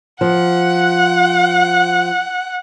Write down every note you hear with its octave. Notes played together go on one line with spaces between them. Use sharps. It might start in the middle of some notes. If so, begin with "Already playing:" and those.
F3 F#5